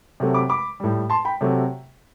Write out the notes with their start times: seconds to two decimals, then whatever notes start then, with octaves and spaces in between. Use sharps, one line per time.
0.20 C3 F#3 A3
0.34 B5 D6
0.49 B5 D6
0.80 A2 G3
1.10 A5 C6
1.25 G5 B5
1.41 C3 F#3 A3